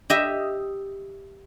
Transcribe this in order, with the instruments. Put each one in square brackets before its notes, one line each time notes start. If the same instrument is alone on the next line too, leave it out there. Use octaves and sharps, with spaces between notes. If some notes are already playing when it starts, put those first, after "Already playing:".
[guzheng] G4 D#5 E5